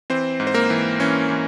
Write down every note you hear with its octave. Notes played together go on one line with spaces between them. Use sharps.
E3 C4 C5
G#2
C5
A#3 A#4
E3
E3 C#4
E3